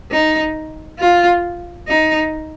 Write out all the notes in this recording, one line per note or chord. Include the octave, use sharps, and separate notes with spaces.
D#4
F4
D#4